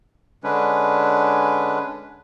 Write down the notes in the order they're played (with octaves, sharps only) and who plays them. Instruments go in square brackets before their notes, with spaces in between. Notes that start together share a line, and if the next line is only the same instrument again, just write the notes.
[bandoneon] D3 G#3 C#4 D4 B4